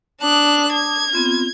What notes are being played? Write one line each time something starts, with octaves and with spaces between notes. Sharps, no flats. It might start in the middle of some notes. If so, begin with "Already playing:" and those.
D4 A5 D6 D#6 F#6
G#6
B3 C4 F4